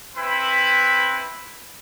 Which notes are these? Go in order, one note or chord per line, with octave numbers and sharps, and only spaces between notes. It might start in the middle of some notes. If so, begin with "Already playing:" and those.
C4 E4 B4 B5